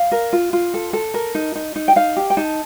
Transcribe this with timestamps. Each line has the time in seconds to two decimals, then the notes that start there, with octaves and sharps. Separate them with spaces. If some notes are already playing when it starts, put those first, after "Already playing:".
Already playing: F5
0.12 A#4
0.33 F4
0.53 F4
0.74 A4
0.93 A4
1.14 A#4
1.35 D#4
1.55 D#4
1.76 D#4
1.88 G5
1.96 D#4 F5
2.16 G4
2.30 G5
2.37 D#4 A5